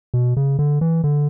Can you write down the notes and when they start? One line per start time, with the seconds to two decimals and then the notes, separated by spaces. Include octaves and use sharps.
0.14 B2
0.37 C#3
0.59 D3
0.81 E3
1.04 D3